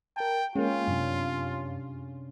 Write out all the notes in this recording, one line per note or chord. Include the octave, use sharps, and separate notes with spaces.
A#4 G5 A5
G#3 A#3 C#4 F4
F#2 C3 D4